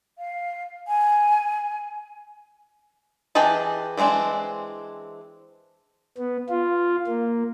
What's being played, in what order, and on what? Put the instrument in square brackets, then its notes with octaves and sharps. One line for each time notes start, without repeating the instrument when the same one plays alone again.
[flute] F5
G#5
[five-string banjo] E3 G4 G#4 D#5 A5
E3 G#3 B3 C4 D4
[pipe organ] B3
F4
A#3